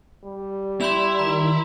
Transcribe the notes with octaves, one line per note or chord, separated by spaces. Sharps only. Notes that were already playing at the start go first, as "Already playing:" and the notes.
G3
E4 C6 G6 F7
D#3 A#5